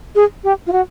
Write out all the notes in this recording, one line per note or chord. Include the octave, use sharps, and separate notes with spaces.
G#4
G4
F4
F#4